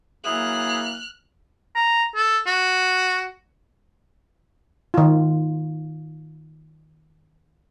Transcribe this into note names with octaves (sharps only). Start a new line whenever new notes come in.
E3 F#3 A#3 G#4 E5 F6 F#6
A#5
A4
F#4
D#3 F4